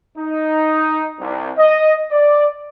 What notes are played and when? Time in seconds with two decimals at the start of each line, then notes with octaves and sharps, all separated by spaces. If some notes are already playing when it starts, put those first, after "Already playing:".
0.18 D#4
1.20 C2
1.57 D#5
2.12 D5